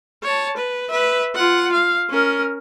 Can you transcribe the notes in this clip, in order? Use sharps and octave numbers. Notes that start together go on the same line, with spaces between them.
C#5 A5
B4
B4 E5
F4 F#5
F5
C#4 A#4